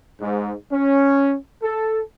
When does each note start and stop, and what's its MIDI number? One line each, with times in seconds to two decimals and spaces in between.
0.21 0.52 44
0.72 1.36 61
1.62 2.00 69